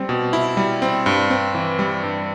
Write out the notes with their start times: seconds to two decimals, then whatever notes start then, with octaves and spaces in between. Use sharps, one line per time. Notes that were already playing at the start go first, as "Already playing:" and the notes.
Already playing: G3 C4
0.09 B2
0.33 E4
0.57 G3
0.82 C4
1.06 G2
1.30 C4
1.55 E3
1.79 G3
2.03 G2